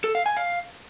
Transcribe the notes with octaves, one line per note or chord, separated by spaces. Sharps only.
A4
F5
G#5
F5